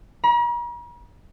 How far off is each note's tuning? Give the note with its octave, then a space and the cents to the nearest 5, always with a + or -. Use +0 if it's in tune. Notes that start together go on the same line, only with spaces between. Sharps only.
A#5 +45